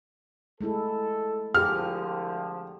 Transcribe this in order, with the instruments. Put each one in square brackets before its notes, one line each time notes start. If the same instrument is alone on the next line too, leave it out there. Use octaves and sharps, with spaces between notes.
[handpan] G#3 A3 E4 [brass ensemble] A4
[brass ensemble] C2 D3 F3 [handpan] G4 G#4 [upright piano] F6